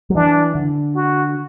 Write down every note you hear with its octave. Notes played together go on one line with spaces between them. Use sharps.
F#3
E3 D4
D3
F#4